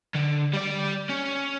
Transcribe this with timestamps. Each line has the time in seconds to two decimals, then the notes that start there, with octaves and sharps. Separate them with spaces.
0.15 D3
0.54 G3 D5
1.10 C#4